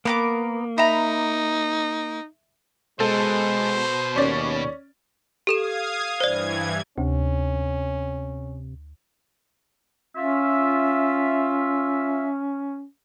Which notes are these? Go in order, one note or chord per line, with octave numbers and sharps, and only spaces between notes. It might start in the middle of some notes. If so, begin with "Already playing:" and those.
A#3 B3 A#4 D6
D#4 E5 A#5 B5
B2 G#3 A4 C5
D#2 C#4 D5
G4 A4 F5 D#6 G#6 E7
G2 E3 C5 D5 G#6
D2 C3 C#4
C#4 F4 E5